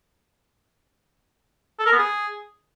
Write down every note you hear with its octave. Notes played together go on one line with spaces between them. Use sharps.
A4
A#4
B3
G#4